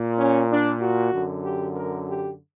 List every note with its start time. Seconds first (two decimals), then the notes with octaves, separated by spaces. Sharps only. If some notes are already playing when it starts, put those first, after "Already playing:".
Already playing: A#2
0.18 C#4
0.49 D4
0.80 F#4
1.12 F#2 D3
1.44 G4
1.75 A#4
2.07 G4